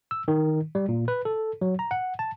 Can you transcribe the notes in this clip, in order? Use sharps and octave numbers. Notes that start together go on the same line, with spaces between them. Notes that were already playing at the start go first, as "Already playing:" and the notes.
E6
D#3
G3
A#2
B4
A4
F#3
A#5
F#5
A5